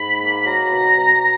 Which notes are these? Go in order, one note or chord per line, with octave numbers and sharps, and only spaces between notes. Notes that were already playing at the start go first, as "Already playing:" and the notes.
Already playing: G#2 B5
A#3
F#3 A#5
B2
B2